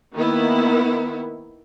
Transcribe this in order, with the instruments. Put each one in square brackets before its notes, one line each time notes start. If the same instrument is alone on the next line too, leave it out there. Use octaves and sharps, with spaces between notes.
[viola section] D#3 A#3 B3 E4